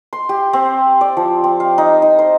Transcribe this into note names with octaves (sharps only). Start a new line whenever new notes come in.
C6
G4
C4
D5
F3
C4
F5
D#4
D#4
C5